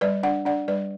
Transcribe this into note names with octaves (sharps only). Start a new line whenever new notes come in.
G3 B4 D5
D4 D5 F#5
D4 D5 F#5
G3 B4 D5